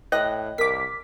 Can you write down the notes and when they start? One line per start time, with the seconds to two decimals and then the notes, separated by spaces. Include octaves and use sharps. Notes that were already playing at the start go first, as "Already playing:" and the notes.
0.12 A2 D#5 G5 F#6
0.58 C2 A#4 D6 B6